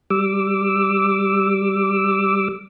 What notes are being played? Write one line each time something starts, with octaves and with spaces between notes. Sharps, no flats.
G3 D6 E6